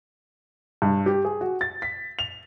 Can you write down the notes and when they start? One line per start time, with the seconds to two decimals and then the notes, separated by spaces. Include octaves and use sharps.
0.82 G2
1.06 G4
1.25 G#4
1.41 F#4
1.61 A6
1.82 B6
2.19 F7